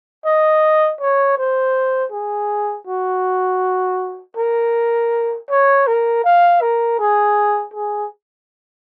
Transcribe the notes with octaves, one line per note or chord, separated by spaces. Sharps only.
D#5
C#5
C5
G#4
F#4
A#4
C#5
A#4
F5
A#4
G#4
G#4